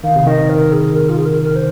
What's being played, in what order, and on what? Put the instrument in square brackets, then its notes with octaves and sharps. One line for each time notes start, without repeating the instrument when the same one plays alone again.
[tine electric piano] D#3 [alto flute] F5
[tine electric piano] C3
[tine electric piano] D#3 [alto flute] D#5
[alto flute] A#4
G#4
A#4
F4
G#4
A#4
A#4
C5